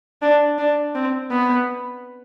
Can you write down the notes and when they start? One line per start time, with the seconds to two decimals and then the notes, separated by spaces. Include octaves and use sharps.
0.22 D4
0.58 D4
0.95 C4
1.30 B3